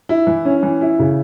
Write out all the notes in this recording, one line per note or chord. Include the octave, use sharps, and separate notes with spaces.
E4
E3
C#4
E3
E4
C#3